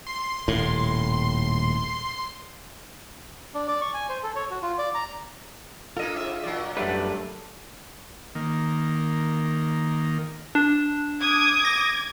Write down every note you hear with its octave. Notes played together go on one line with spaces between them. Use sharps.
C6
D#1 A2
D4
D5
C#6
G#5
C5
A4
C#5
F#4
F4
D5
A#5
A#3 D4 F4 A4 D#5
G#2 E5
A#2 F#3 D5
F#2 G3 A3 D4 B4
D#3 A#3
D4
D6 D#6 G#6
A#6